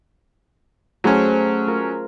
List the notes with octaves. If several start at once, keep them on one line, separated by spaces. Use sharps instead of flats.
F#3 A3 C#4 G#4 C5
F4 A#4